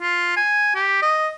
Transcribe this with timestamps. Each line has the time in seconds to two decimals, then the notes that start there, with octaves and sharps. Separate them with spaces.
0.01 F4
0.37 G#5
0.75 G4
1.02 D#5